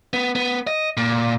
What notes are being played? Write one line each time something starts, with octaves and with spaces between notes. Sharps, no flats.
B3
B3
D#5
A#2